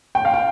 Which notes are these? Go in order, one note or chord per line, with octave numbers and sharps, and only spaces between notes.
G5
F5
G5